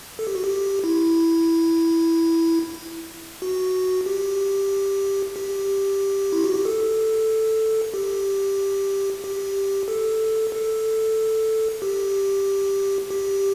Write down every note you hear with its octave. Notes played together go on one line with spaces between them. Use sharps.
A4
G4
F#4
G4
E4
F#4
G4
G4
E4
F#4
G4
A4
G4
G4
A4
A4
G4
G4